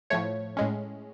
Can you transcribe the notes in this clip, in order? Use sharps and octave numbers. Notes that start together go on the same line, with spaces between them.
A2 F3 A3 C#5
A2 G#3 C#4